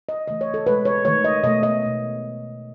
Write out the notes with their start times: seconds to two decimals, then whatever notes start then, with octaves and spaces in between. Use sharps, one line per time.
0.09 D#5
0.28 C#3 E3 A3 D#5
0.41 C#5
0.54 A4
0.67 B2 G#3 B4
0.85 C#5
1.05 D#3 A3 C#5
1.25 D#5
1.44 B2 A3 D#5
1.63 D#5
1.83 B2 A3